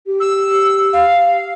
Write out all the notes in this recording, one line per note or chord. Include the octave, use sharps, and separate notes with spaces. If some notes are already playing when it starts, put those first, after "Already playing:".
G4
E6
F5